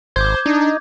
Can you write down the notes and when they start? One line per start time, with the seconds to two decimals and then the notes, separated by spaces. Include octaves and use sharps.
0.16 G#1 C5 D6 G6 G#6
0.46 D4 D#4